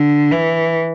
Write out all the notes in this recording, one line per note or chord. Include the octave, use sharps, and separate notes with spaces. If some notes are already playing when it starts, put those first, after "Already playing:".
Already playing: D3
E3